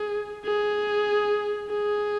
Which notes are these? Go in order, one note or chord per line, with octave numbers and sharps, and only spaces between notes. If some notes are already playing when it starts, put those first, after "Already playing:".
Already playing: G#4
G#4
G#4